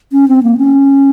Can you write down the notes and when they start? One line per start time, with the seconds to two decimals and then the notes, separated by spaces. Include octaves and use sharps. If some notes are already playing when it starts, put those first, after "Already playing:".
0.12 C#4
0.28 C4
0.43 A#3
0.57 C#4